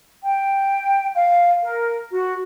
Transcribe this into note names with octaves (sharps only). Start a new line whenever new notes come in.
G5
F5
A#4
F#4